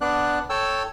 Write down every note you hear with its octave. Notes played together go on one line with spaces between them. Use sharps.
B3 D4 D5 F#6
A4 C#5 G5 A5 E6